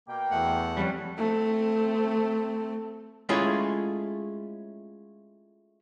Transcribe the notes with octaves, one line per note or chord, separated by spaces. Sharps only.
B2 A#3 G5
E2 A3 F#5
F2 G3 C#4 B4
A3 C4
G#3 A3 C#4 E4 F4 G#4